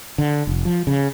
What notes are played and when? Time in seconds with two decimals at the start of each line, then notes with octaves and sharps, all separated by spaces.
0.18 D3
0.47 F1
0.65 F3
0.87 C#3